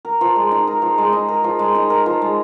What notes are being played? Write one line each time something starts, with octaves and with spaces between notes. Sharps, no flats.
A#4
F3
G#3
D#4
A#4
F3
G#3
D#4
A#4
F3
G#3
D#4
A#4
F3
G#3